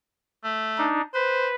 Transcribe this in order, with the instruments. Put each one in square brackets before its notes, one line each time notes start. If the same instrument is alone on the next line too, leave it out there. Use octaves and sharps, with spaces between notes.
[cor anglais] A3
[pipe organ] D4 D#4
[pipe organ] B4 [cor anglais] C5